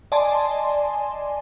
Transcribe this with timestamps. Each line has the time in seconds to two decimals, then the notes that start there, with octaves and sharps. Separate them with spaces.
0.12 D5 D#5 G#5 A5 C6